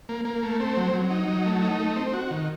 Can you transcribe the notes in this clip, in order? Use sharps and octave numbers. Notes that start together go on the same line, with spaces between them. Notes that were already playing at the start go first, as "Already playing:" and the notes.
A#3
A#3
A3
C4
F#3
F#3
D#4
F#3
A3
D#4
A3
C4
F#4
D#3